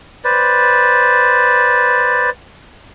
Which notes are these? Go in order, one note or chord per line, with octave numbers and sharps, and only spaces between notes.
B4 C5 D5